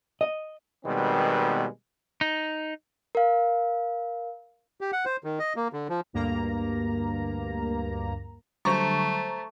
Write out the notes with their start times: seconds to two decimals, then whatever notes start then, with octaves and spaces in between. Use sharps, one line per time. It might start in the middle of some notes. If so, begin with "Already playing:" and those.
0.21 D#5
0.85 B2 D#3 G3 G#3 B3 C4
2.21 D#4
3.15 A#4 F5
4.81 G4
4.92 F#5
5.05 C5
5.24 D#3
5.39 D#5
5.56 A#3
5.73 D3
5.89 F3
6.13 D2 G2 A#3 A#5
8.65 D3 F#3 G3 A3 C5 A#5 C#6 A6